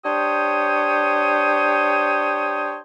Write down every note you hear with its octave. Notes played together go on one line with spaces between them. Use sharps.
D4 G4 C5 C#5 D#6